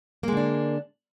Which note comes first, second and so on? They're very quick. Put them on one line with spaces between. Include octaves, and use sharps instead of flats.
A#3 G#3 D3 D4